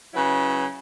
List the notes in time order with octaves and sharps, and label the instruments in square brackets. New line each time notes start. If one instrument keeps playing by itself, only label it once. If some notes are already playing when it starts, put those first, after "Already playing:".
[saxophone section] C#3 F#3 E4 B4